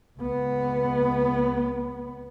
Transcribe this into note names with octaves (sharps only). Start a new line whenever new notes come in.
C#2 B3